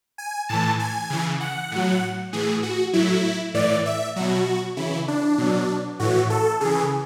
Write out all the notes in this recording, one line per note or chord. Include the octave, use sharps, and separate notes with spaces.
G#5
A2 E3 A5
G#5
C#3 E3
F#5
A2 F#3
A2 E3 G#4
F#4
A2 F#3 E4
A2 E3 D5
E5
B2 F#3 F#4
C#3 E3 E4
D4
B2 F#3
A2 E3 F#4
A4
C#3 E3 G#4